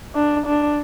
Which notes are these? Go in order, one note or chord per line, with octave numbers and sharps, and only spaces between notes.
D4
D4